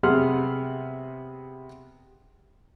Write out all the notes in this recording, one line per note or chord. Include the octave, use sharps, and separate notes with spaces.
C3 B3 G#4 F#5 C6 F6